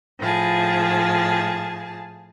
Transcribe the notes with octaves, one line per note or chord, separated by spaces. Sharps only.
A2 F3 G#4 A5